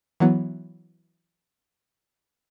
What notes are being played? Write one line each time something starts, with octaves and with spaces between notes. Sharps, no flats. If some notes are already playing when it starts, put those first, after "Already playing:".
E3 F#3 B3